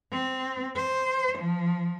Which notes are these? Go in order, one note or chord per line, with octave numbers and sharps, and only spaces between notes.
C4
C5
F3